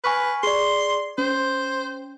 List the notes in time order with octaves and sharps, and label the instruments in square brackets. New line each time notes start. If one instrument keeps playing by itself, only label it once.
[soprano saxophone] B4 [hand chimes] G#5 C#6 F6
[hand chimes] G#4 D5 [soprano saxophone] C6
[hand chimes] C#4 [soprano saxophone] C5